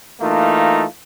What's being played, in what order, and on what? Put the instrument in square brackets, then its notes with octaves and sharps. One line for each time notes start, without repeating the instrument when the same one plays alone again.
[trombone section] E3 A3 A#3 D#4 F4